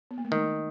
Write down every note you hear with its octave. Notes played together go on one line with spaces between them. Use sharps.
B3
A#3
A3
D#3 G#3